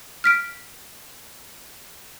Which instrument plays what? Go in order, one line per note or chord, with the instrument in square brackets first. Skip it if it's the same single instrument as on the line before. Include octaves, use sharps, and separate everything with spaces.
[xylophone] F6 B6 D7